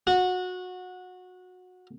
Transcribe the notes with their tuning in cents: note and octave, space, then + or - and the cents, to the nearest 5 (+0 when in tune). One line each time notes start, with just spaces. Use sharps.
F#4 -20